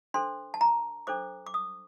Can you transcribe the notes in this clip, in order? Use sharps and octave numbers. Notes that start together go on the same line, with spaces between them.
D4 A4 C5 C6
A5
A#5
D4 A4 C5 D6
D6
D#6